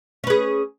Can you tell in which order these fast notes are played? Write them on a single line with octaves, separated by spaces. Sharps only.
C#4 B4 G#4